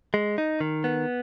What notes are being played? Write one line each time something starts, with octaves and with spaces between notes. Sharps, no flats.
G#3
D#4
D#3
B3